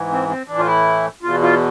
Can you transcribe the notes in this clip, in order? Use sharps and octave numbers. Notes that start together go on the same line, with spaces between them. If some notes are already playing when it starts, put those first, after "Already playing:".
Already playing: G#2 E3
C4
C4
A2 E3 D4
F4
E4
E2 B2 F4
F4